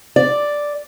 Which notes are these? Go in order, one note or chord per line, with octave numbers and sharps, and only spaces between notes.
D5